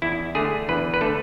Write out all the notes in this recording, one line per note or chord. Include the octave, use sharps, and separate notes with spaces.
E2 E4
D3 A3 G#4
E2 B4
B4
D3 A3 A4